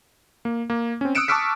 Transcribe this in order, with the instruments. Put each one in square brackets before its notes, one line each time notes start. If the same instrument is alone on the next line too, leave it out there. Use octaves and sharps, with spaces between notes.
[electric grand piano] A#3
A#3
C4 C#4
D#6 E6 F#6 C#7 D7 E7
A5 C#6 D6 E6 F6 B6